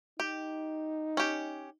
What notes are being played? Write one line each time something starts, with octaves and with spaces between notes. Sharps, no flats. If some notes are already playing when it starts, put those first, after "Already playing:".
D#4 G4
C#4 G4